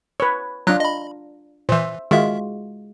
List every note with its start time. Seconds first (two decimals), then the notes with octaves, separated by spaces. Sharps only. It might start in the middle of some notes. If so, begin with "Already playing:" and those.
0.20 B4 C#5
0.67 F#3 D4 F4 A#5 F#6
0.80 D#5 B5
1.69 A#2 E3 C5 E5
2.11 D#3 G#3 F4 F#4 E5